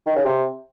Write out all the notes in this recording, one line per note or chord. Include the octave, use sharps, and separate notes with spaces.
D#3
C#3
C3